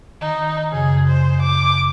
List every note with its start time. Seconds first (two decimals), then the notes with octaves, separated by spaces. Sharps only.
0.21 D#3 D#4
0.72 F#2 C#3 G#4
1.07 C5
1.42 D6